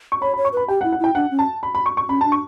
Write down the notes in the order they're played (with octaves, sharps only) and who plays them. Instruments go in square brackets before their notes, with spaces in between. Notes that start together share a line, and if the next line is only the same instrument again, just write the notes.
[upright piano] C#6
[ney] C#5 [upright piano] B5
[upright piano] B5
[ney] C#5
[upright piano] C#6
[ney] B4 [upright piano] B5
[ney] G4 [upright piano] G5
[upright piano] F#5
[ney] E4
[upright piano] F#5
[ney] E4 [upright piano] G5
[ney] D4 [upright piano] F#5
[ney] C#4
[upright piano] A5
B5
B5
C#6
C#6
[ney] C#4 [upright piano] B5
[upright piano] A5
[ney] D4
[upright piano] C#6